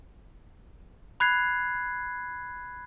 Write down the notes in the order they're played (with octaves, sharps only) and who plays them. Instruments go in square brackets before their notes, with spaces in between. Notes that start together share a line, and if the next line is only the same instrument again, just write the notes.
[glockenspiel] B5 F#6 G#6 C7